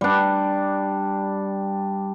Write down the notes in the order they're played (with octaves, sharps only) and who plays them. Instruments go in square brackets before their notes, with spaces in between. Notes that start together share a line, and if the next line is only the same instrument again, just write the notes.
[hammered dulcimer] G3 D4